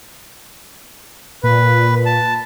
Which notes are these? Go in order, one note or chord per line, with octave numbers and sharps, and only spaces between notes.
A#2 B4
A5